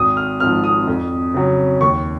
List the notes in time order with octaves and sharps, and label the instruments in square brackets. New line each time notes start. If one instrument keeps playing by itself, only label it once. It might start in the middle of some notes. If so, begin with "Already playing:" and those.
Already playing: [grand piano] G#1 D#6
F6
G#2 F3 C4 F6
D#6
F2
C#3 F#3
D#2 C#6